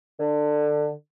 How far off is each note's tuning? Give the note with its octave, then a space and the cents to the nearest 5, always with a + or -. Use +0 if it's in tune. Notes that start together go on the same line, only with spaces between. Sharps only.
D3 +20